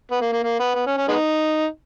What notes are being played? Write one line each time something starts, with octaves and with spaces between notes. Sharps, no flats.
B3
A#3
A#3
A#3
B3
B3
C#4
C#4
G#3 B3 D#4